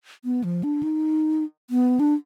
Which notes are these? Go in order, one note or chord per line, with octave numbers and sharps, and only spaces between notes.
B3
F3
D4
D#4
B3
D4